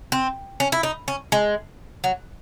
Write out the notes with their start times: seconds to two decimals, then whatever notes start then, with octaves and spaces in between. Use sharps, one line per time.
0.12 C4
0.60 C#4
0.72 E4
0.83 D#4
1.08 C#4
1.32 G#3
2.04 F#3